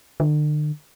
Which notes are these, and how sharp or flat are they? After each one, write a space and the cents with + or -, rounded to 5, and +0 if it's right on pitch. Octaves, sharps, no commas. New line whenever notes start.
D3 +40